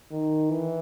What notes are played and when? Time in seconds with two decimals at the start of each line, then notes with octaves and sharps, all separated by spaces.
0.11 D#3
0.51 E3